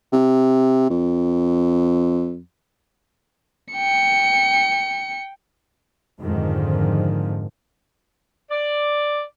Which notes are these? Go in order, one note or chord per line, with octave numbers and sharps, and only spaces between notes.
C3
F2
G5 C#7
F2 G#2 D3 D#3 F3
D5